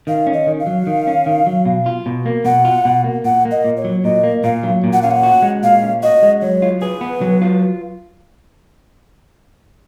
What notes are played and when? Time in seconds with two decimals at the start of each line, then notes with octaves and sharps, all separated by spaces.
0.07 D#3 F5
0.27 C#4
0.33 D#5
0.47 D#3
0.60 F5
0.67 F#3
0.87 D#3
1.07 C#4
1.26 D#3
1.47 F#3
1.65 B2
1.86 F4
2.06 B2
2.25 A#3
2.45 B2 F#5
2.65 F4
2.85 B2
3.04 A#3
3.24 A#2 F#5
3.45 A#3
3.51 D#5
3.65 A#2
3.77 C#5
3.84 F#3
4.04 A#2 D#5
4.23 A#3
4.44 A#2 F5
4.63 F#3
4.84 A#2
4.93 F#5
5.02 C#4 F5
5.11 F#5
5.23 F#4
5.42 G#3
5.63 A#2 F5
5.83 C#4
6.03 F#4 D#5
6.23 G#3
6.41 F#3 C#5
6.62 F4
6.81 G#4 B4
7.01 B3
7.21 F#3
7.42 F4